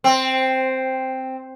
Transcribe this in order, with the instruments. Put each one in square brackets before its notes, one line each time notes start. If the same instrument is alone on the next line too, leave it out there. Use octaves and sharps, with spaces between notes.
[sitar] C4